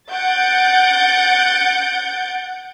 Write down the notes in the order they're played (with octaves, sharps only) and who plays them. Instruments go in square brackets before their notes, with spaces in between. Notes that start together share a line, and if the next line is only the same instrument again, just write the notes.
[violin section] F#5 G6 A6 D7